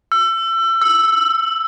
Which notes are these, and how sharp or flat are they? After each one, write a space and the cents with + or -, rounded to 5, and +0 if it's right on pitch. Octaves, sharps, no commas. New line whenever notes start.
E6 +30
E6 +0